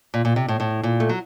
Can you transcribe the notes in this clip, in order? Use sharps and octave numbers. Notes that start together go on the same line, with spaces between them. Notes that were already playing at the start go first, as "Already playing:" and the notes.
A#2
A#2
C3
A2
A2
A#2
A3
F#3